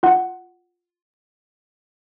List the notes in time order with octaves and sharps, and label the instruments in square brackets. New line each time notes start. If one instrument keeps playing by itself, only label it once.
[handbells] F4 F#5